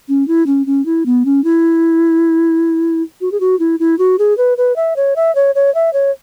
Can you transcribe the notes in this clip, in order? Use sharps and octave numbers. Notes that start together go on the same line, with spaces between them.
C#4
E4
C#4
C#4
E4
B3
C#4
E4
F#4
G#4
F#4
E4
E4
F#4
G#4
B4
B4
E5
C#5
E5
C#5
C#5
E5
C#5